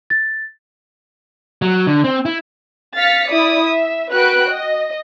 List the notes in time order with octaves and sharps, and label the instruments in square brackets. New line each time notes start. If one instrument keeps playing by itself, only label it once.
[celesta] A6
[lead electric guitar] F#3
D3
C4
E4
[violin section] F5 F6 A6 B6 C#7
E4 D5 D#6
E5
F#4 B4 G5 F#6 D7
D#5